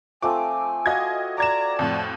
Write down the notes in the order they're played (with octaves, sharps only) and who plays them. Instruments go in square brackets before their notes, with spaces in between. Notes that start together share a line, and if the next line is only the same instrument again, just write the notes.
[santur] F3 A3 C4 [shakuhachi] G#5 [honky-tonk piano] D6
[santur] F#4 F5 F#5 [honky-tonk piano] D#5 G#6
[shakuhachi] D5 [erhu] A#5 [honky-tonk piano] D6 G#6 E7
[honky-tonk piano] F2 A2 [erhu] A5